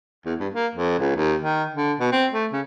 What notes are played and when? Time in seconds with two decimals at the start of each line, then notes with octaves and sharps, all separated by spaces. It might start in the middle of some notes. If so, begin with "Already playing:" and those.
0.26 E2
0.39 G2
0.54 A#3
0.75 F2
0.99 C#2
1.16 D#2
1.40 D#3
1.75 D3
2.00 B2
2.12 C4
2.33 A3
2.52 C#3